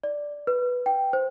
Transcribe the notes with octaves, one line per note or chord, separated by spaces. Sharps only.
D5
B4
G5
C5